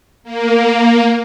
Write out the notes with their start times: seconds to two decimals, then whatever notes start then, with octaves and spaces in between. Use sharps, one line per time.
0.24 A#3